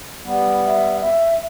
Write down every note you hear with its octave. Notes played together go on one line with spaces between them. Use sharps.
G3 B3
E5
E5